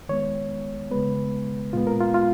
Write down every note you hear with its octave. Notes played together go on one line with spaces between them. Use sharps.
D#3 G#3 B3 C#5
C#3 G#3 B3 B4
A#2 G#3 B3 F4
A#4
F4
F4